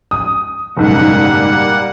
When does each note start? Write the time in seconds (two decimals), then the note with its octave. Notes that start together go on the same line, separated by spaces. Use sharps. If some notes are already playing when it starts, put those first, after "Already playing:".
0.11 D#6
0.77 F#1 B1 G#2 G3 A#3 F#5